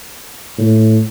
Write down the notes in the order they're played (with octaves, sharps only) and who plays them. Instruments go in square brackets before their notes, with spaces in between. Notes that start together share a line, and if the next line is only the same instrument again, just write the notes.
[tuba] A2